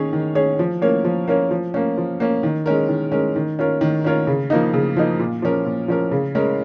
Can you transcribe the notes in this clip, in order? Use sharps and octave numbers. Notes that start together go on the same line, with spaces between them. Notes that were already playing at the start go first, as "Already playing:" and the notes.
Already playing: D#3 C#4 G#4 C#5
D#3
C#4 G#4 C#5
F3
A#3 C#4 A#4 C#5
F3
A#3 C#4 A#4 C#5
F3
A#3 C#4
F3
A#3 C#4
D#3
G#3 C#4 A#4
D#3
G#3 C#4 A#4
D#3
C#4 F4 A#4 C#5
D#3
C#4 F4 A#4 C#5
C#3
F3 A#3 D#4
C#3
F3 A#3 D#4
A#2
F3 C#4 A#4
A#2
F3 C#4 A#4
C#3
G#3 C#4 A#4